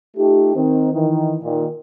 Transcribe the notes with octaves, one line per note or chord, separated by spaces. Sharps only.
A3 D#4 F4 G4
D#3 C4
D#3 E3
A#2 D#3